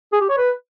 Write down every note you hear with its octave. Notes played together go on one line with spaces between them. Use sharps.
G#4
G4
C#5
B4